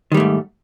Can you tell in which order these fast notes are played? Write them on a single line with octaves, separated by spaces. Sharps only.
D#3 G3 A3 G#2